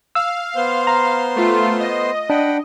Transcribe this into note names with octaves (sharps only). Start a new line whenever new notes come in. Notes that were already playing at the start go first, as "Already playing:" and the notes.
F5 E6
B3 C5 C6
A#5
A3 F4
D#5
D4 F#5 G5 B5